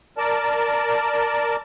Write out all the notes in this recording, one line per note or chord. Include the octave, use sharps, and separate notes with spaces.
A#4 D5 A5